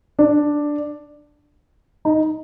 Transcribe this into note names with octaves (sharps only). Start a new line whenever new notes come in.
D4
D#4